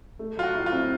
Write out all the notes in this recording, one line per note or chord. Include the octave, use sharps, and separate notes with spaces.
A3
F#3 F4
F#4
E4
F4
C4